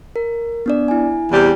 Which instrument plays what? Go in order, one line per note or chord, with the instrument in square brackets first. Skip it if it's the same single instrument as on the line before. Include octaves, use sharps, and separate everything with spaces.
[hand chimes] A#4
B3 D4 D5
E4 G#5
[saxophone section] E2 C3 G3